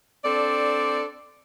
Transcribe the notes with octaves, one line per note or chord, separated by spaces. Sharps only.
C4 D4 A4 D5